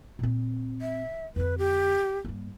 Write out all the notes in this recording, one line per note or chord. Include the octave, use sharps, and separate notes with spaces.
A#2 C4
E5
F2 D3 B4
G4
G2 A#3